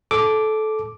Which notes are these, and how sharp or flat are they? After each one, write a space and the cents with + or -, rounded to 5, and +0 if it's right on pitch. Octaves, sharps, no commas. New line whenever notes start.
A4 -20 D6 +0